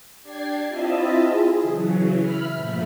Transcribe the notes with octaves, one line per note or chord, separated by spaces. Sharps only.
D4 G4 D5 G#6 C7
C4 E4 F4 D#5 E5 A5
G#4
C#3 E3 F#3
E5 B5 F6
G2 A#2 F3 A3